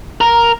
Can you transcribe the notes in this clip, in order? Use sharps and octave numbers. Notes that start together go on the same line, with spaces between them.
A#4